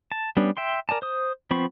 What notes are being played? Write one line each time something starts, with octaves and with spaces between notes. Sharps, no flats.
A5
G3 B3 C#4 D4
E5 G5 C6
A#4 D5 G#5 A5
C5 D#6
F3 B3 C4 B5 C#6